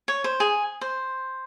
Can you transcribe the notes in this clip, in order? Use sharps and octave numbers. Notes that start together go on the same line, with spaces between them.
C#5
C5
G#4
C5